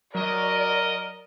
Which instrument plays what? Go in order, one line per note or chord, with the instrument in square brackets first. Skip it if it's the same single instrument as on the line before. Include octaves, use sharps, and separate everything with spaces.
[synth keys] F#3 [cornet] A#4 [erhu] D5 [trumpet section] D#5